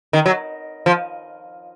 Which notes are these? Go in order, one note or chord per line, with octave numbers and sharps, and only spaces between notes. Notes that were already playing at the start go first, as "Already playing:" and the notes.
D#3
F#3
F3